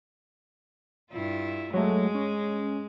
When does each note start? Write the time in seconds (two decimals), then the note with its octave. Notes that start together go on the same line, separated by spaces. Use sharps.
1.12 G2 E4 F4
1.74 F#3 G#3 A3
2.14 C#4